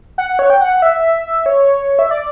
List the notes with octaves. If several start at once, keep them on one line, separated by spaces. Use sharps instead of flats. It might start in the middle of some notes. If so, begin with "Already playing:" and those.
F#5
C#5
G5
F#5
E5
C#5
E5
D5